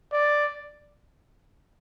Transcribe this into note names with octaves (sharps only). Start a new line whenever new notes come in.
D5